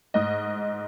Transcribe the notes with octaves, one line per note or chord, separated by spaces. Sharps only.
G#2 D#5